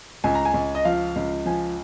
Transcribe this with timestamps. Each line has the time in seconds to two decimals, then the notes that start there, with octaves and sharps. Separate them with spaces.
0.24 C#2 G#5
0.35 A#5
0.45 G#5
0.54 C#2
0.75 D#5
0.85 F3 F5
1.16 C#2
1.46 F3 G#5